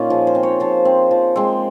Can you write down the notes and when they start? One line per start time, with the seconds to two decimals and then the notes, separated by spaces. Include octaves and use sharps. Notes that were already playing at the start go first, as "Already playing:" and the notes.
Already playing: A#2 A#3 C#4 D#4 F4
0.10 F3 G#4
0.27 C5
0.35 C4
0.43 C#5
0.60 F3 C5
0.85 C4
1.11 F3
1.36 G#3 C4